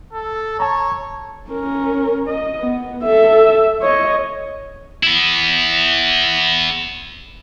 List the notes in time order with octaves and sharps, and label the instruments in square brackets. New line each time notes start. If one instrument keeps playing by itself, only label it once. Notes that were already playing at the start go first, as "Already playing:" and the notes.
[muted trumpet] A4
[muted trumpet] C#5 [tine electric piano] A5 A#5
[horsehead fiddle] C#4 A#4
D#5
B3
A4 E5
C#5 D#5
[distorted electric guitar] B3 E4